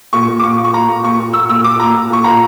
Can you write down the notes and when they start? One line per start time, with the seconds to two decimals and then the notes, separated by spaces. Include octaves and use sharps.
0.13 A#2 C#6
0.28 A#2
0.39 D6
0.43 A#2 C#6
0.58 A#2
0.64 C#6
0.73 A#2 A#5
0.89 A#2
1.03 A#2 C#6
1.19 A#2
1.33 A#2 E6
1.49 A#2 E6
1.64 A#2 D6
1.79 A#2 A#5
1.94 A#2
2.10 A#2 C#6
2.24 A#2 A#5